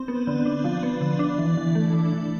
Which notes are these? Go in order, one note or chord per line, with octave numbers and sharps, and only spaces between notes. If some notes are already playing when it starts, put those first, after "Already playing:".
Already playing: C4
B3
D3
D4
F3
B3
D3
D4
E3
E3
A3
D4
E3